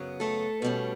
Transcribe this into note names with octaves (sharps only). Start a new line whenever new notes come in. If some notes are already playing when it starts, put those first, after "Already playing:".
Already playing: F#2 C#3 F#3 B3
A3 A4
B2 G3 C#4